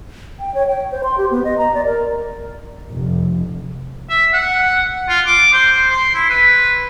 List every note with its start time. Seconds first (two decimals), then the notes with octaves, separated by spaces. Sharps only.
0.40 G5
0.55 C#5
0.67 G5
0.92 C5
1.03 C6
1.18 G4
1.31 B3
1.44 D#5
1.58 A#5
1.74 D5
1.86 A#4
2.90 F1
4.10 E5
4.33 F#5
5.08 F4
5.26 D6
5.53 C5
5.90 C6
6.15 E4
6.30 B4